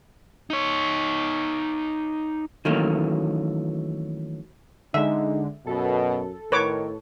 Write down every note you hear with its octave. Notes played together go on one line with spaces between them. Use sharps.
D#4 C#5
D#3 E3 F#3 A3 A#3 C#4
D3 G#3 D#4 E5
F#2 B2 A4
A2 D#3 A#4 B4 C#5 D6